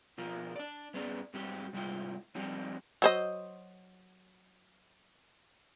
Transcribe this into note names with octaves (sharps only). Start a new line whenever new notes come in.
B2 F3 F4 A#4
D4 D5
G2 B3 C#4 G#4 D5 A#5
G#2 G3 C4 F#4 G4
G#2 C3 G3 E4 F4 G5
F3 G3 C4 D4 D#4 G4
F#3 C5 D#5